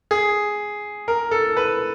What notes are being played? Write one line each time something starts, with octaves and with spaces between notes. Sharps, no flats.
G#4
A#4
A4
B4